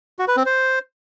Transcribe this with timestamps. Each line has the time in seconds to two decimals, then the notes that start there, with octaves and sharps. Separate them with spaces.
0.19 F#4
0.28 B4
0.37 C4
0.46 C5